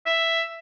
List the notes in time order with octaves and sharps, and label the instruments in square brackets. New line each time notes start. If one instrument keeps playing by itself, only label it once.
[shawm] E5